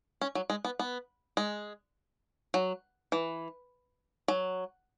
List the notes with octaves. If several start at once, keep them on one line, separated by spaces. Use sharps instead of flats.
C#4
F#3
G#3
B3
B3
G#3
F#3
E3
F#3